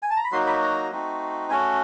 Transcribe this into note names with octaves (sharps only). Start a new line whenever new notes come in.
G#5
A5
A#5
B5
F#3 A#3 D#4 F#4 C6
B5
A#5
A3 C4 D#4 F#4
A3 C#4 F#4 G#5